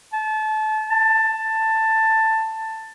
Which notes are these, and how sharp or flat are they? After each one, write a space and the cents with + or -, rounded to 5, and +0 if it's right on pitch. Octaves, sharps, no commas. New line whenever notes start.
A5 -30
A5 +10